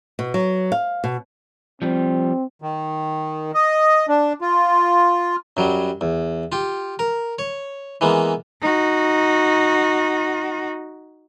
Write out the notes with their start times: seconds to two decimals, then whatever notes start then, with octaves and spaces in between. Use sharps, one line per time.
0.19 B2
0.34 F#3
0.72 F5
1.04 B2
1.82 F3 G3 C4
2.62 D#3
3.54 D#5
4.08 D4
4.41 F4
5.57 F#2 F#3 G3
6.01 E2
6.52 F4 G4
6.99 A#4
7.39 C#5
8.01 E3 G#3 A#3 B3
8.62 D#4 F#4